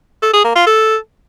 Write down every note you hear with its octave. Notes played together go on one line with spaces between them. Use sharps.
A4
G#4
A#3
F4
A4